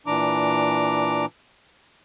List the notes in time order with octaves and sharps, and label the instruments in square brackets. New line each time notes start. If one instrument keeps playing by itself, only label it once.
[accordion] A#2 E3 D4 A#5 D6